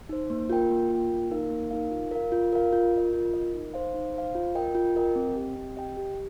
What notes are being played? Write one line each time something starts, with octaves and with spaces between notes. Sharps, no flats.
D#4 C5
A#3
F4 A#4 G5
A#3
F4 A#4 G5
A#3
D#4 A#4 F5
A#3
D#4 A#4 F5
F4
A#4 F5
F4
A#4 F5
F4
A#4 D#5
F4
A#4 D#5
D#4
C5 F5
D#4
C5 F5
F4
A#4 D#5 G5
F4
A#4 D#5 G5
C4
G4 D#5 G5
C4
G4 D#5 G5
G4